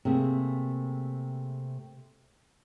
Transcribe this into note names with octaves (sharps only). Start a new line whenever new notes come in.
C3 A3 A#3 G#4